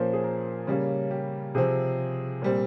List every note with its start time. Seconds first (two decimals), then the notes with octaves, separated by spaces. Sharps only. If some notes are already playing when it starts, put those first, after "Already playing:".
Already playing: A#2 F3 A#3 C#4 C5
0.14 G#4
0.24 A#4
0.67 C#3 G3 A#3 C#4
1.11 G4
1.55 C3 F3 C4 G#4
2.42 A#2 G3 C4